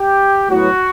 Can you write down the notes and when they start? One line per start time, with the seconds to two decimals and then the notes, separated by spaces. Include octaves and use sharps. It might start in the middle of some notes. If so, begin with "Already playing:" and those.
Already playing: G4
0.48 A2 F#3 B3 F#4